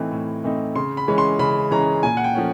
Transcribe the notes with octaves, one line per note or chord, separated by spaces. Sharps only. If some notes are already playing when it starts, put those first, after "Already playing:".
Already playing: A2 E3 A3 C4 D#4
A2
E3 A3 C4 D#4
C#3 C6
B5
E3 G#3 C#4
C6
C#3 B5
E3 G#3 C#4 A#5
A#2 G#5
F#5
G5
F3 A3 C#4